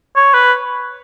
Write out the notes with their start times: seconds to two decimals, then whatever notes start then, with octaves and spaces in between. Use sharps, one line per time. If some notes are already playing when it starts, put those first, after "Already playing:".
0.16 C#5
0.34 B4